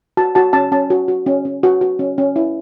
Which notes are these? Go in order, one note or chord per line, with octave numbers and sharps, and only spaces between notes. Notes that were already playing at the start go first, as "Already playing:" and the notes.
F#4 A5
F#4 A5
C#4 A5
C#4 A5
F#4
F#4
C#4
C#4
F#4
F#4
C#4
C#4
E4